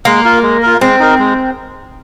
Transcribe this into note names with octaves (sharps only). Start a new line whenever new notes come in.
G#3 A#3
F4 A#4
G#3
F4 A#4
G#3 C4
D#4 A#4
G#3